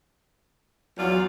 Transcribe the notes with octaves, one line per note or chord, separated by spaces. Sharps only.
E2 F#3 F4 D5